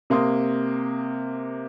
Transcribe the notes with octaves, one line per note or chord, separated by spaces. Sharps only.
C3 A#3 C6 D#6